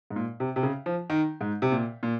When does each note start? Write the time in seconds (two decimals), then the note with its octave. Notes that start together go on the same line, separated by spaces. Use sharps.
0.10 G#2
0.16 A#2
0.40 C3
0.56 C3
0.63 C#3
0.86 F3
1.10 D#3
1.41 G#2
1.62 C3
1.72 A#2
2.03 A#2